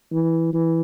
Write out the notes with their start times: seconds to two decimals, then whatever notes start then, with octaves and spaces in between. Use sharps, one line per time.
0.12 E3
0.53 E3